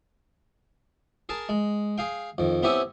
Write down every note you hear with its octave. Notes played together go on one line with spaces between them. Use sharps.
G#4 A#4 A5
G#3
G#4 F5 G5
F2 D#3
B3 C4 E4 G4 C#5 G#5